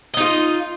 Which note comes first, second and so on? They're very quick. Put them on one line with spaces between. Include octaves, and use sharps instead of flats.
D#5 D#4 F4